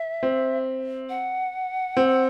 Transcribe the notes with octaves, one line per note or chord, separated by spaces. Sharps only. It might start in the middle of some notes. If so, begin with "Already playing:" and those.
Already playing: E5
C4
F#5
C4